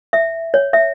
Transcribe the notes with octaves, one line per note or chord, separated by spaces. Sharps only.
E5
C#5
E5